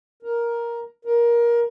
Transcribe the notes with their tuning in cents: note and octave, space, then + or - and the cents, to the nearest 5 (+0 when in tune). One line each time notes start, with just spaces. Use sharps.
A#4 +10
A#4 +20